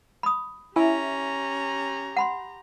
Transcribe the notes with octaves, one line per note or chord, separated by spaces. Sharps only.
B5 D#6
C#4 E4 G4 G#5 A#5
F#5 B5 C6